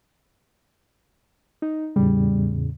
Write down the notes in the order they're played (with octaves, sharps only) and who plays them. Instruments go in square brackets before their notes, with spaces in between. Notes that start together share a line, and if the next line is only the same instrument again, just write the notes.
[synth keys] D#4
[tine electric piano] E2 A2 C#3 [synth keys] G3